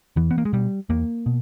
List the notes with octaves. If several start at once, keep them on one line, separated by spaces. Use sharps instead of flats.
E2 E3
B3
A#3
G#3
B2 G3
E2 A#3
B2